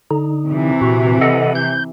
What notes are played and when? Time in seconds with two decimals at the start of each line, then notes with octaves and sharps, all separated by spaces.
0.11 D3 D#4
0.47 C3 E3
0.81 A#2 F#4
1.21 A4 D#5 F#5
1.55 G6